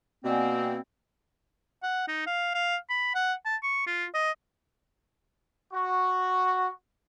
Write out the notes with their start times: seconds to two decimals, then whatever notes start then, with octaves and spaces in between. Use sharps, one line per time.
0.25 B2 A#3 C4 D5 F#5 G#5
1.83 F#5
2.08 D#4
2.27 F5
2.55 F5
2.90 B5
3.15 F#5
3.45 A5
3.63 C#6
3.87 F4
4.14 D#5
5.73 F#4